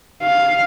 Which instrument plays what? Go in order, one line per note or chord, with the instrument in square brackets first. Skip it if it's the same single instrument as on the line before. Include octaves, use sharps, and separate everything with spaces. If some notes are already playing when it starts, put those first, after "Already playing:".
[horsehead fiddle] F5